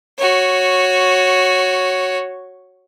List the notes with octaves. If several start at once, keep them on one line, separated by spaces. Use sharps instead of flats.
F#4 C#5